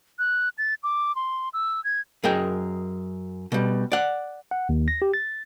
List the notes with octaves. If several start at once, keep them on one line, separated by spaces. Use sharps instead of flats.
F#6
A6
D6
C6
E6
G#6
F#2 G#4 A#4 D#5 G5
B2 G3
D5 F#5
F#5
D#2
A#6
G4
A6